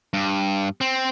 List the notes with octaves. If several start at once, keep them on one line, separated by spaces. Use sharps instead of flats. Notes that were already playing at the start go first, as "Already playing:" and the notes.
G2
C4